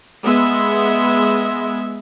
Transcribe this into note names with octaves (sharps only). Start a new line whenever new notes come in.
G#3 B3 E5